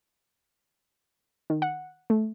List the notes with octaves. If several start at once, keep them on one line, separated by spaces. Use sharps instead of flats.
D#3
F#5
A3